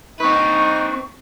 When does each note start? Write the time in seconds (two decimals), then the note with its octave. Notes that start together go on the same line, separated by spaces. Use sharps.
0.20 C4 D#4 B4 C#6